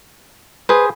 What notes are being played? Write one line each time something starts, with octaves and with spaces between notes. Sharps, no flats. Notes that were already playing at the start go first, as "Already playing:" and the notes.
G#4 B4 C5